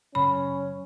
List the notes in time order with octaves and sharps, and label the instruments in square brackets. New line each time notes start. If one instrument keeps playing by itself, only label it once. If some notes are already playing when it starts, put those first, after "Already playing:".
[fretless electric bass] F#2 C#3 [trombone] C#4 [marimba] B5